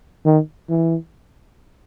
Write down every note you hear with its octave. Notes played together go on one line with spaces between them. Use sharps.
D#3
E3